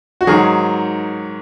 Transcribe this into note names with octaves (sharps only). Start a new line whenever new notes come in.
F#4
G#2 D#3 F#3 G#4